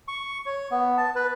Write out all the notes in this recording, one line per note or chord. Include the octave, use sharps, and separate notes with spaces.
C#6
C#5
B3
A5
B4